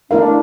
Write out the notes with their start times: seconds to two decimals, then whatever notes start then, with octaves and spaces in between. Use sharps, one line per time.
0.10 A3 D4 E4 A#4 F5